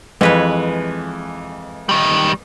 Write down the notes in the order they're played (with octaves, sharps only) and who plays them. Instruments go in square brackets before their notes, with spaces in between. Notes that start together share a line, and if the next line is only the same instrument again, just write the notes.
[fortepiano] F2 E3 [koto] G#3 B4 C#5
[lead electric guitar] D#3 G3